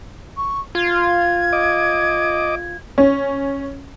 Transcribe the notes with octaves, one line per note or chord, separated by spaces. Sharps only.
C#6
F4 G#6
D#5 D6
C#4